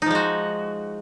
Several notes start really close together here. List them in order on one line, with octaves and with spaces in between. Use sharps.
D#4 F3 G#3 F#4